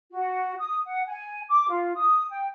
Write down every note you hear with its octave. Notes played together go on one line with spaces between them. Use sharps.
F#4
D#6
F#5
G#5
D6
F4
D#6
G5